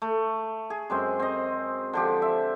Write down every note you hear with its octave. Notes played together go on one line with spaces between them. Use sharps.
A3
G#4
F#2 G#3 C4 C5
C4 D#5
D3 F3 G4
E5